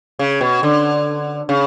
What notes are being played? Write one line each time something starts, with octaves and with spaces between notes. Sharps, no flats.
C#3
B2
D3
C#3